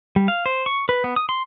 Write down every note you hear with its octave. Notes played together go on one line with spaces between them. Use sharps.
G3
F5
C5
C#6
B4
B3
D#6
C6